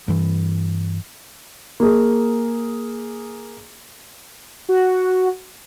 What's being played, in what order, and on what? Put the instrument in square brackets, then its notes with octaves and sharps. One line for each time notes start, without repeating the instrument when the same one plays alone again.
[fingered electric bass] G2 E3
[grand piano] A#3 G#4
[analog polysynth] F#4